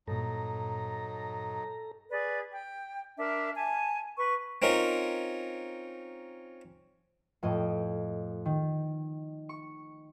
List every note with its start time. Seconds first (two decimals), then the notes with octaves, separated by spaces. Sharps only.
0.08 G2 A#2 F#3 D#4 A4 A#5
2.11 G#4 B4 D5
2.53 G5
3.18 D4 A#4 E5
3.56 G#5 A5
4.18 B4 C#6
4.62 C4 C#4 D#4 F4 A#4
7.43 F2 A2 D#5
8.45 D#3
9.49 C#6